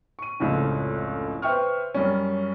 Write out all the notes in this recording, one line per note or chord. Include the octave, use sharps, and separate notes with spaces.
C#6 D#7
F1 C#2 A2 C#3 F3
B4 C5 E5 G5 C#6 F6
F#2 G3 C#4